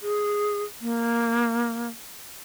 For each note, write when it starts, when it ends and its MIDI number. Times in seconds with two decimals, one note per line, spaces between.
0.01 0.63 68
0.81 1.88 58